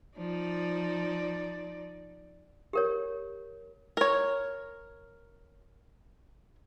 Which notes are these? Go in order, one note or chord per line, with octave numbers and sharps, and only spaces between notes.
F3 D#4 D5
G4 A#4 C#5
A#4 C#5